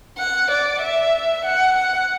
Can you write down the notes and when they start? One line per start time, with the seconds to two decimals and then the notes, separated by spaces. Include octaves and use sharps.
0.19 F#5
0.51 D5
0.82 E5
1.45 F#5
1.77 F#5